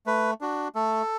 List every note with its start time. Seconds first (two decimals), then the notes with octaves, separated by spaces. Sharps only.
0.06 A3 B4
0.41 D4 F#4
0.75 A3 A4